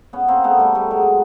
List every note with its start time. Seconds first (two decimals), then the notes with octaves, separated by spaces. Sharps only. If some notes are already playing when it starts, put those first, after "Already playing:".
0.13 B3 C#4
0.28 A#3 C4
0.44 A3 B3
0.59 G3 A3
0.75 G3 A3
0.91 F#3 G#3